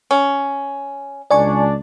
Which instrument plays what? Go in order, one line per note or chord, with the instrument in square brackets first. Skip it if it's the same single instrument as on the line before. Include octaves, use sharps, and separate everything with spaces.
[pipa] C#4
[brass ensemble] C#2 D4 [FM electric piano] D5 G#5 C#6